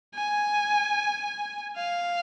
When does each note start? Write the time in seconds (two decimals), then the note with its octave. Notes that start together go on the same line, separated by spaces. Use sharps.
0.15 G#5
1.77 F5